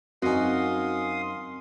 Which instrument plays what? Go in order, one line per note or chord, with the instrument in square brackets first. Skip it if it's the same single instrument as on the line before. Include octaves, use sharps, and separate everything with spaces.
[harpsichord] F#2 D#4 [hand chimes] C4 [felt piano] F#4 G#5 [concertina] F5 C6 D#6